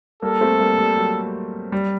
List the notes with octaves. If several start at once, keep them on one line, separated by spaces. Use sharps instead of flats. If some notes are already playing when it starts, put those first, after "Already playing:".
G3 A#3 A4
A3 C4
G3 A#3
G3
F#3
G3